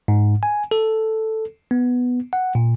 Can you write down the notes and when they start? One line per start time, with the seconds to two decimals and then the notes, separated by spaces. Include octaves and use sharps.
0.08 G#2
0.43 G#5
0.71 A4
1.71 B3
2.33 F#5
2.55 A#2